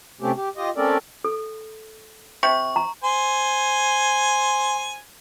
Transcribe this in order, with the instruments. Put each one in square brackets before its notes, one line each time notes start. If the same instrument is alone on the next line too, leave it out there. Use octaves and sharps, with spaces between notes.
[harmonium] C3 A3 C4 C#4 G4
G4
F4 G4 D#5
A3 C4 C#4 A4 A#4 D5
[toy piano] A4
[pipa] C3 [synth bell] C#6
[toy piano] A#5
[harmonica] C5 G#5